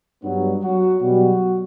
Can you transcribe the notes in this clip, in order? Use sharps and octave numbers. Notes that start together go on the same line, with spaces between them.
G2 F#3 B3
F#3 F#4
B2 F#3 G3 F#4